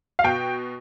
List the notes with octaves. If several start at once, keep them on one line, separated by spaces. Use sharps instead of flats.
F5
B2 G5